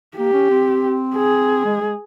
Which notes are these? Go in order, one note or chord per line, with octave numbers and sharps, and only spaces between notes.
A#3 G4
C#4
C4
G#4
G#3
G#3